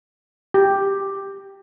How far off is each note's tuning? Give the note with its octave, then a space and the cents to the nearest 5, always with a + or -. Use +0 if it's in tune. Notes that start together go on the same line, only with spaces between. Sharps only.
G4 +5